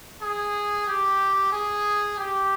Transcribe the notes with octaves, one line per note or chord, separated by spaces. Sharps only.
G#4
G4
G#4
G4